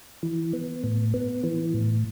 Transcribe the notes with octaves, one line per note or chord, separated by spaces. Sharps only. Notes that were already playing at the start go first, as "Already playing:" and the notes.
E3
B3
A2
B3
E3
A2